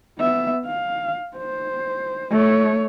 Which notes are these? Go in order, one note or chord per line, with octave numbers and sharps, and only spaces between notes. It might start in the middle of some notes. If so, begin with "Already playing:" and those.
B3 E5
F5
C5
A3 C#5